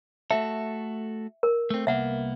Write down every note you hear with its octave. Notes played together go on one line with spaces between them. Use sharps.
A3 F#4 A4 E5
A#4
A3 C4
C2 A#3 B3 E5 F#5